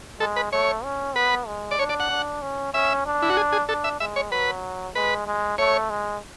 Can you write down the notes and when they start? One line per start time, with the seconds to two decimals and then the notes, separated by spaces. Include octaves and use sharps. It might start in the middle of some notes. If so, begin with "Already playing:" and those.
0.20 G#3 A4
0.36 B4
0.52 A3 C#5
0.84 C#4
1.15 B3 B4
1.47 G#3
1.71 D5
1.79 D4 C#5
1.89 D5
2.00 F#5
2.10 D4
2.42 C#4
2.74 C#4 E5
3.06 D4
3.22 E4
3.30 F#4
3.37 G#4
3.52 G#4
3.68 D4 A4
3.84 E5
4.00 G#3 E5
4.16 C#5
4.31 F#3 B4
4.95 G#3 B4
5.27 G#3
5.58 A3 C#5
5.90 G#3